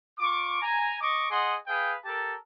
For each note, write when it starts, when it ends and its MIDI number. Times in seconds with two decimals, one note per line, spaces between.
0.19 0.58 65
0.19 0.58 85
0.19 0.58 86
0.61 0.97 80
0.61 0.97 82
1.00 1.27 75
1.00 1.27 85
1.00 1.27 86
1.30 1.55 68
1.30 1.55 75
1.30 1.55 78
1.30 1.55 84
1.67 1.94 68
1.67 1.94 71
1.67 1.94 77
1.67 1.94 79
2.05 2.34 67
2.05 2.34 69
2.05 2.34 70
2.05 2.34 81